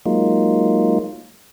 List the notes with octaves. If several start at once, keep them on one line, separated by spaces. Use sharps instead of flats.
F#3 G#3 A#3 D#4 F4